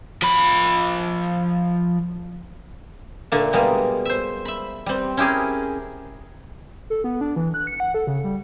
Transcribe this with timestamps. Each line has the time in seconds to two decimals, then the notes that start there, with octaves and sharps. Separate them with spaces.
0.22 F3 B5
3.32 A#2 D3 A3 A#3
3.53 B2 G3 G#3 A#3
4.05 C5 E5
4.45 E5 B5
4.86 G3 C4
5.17 C#4 E4 G4 G#4 A#4
6.90 A4
7.04 B3
7.21 D4
7.36 E3
7.54 F#6
7.67 C#7
7.80 F#5
7.94 A4
8.07 C#3
8.24 G3